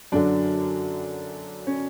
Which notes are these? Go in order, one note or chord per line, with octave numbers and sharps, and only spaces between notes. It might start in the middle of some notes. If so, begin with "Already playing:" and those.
F#2 D3 F#3 D4
C#4